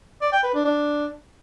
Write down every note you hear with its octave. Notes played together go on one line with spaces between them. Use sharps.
D5
G5
B4
D4
D4